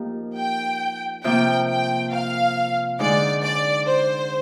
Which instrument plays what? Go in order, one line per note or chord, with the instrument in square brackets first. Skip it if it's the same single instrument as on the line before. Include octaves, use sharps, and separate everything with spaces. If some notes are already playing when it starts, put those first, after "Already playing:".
Already playing: [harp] F3 A#3 D#4 G4 A#4
[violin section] G5
[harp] C3 F3 A#3 [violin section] G5
[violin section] G5
F5
[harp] D3 G#3 D#4 [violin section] D5
[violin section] D5
C5